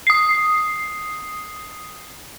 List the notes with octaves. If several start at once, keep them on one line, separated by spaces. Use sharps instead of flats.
D#6 C7